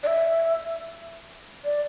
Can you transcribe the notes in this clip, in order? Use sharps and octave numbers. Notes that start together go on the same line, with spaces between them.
D5
E5
D5